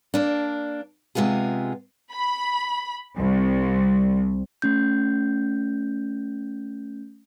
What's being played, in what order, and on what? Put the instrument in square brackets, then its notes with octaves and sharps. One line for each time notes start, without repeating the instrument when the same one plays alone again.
[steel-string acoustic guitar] A#3 D4
C3 G#3 B3 F4 G#4
[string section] B5
C2
[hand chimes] A3 C#4 G6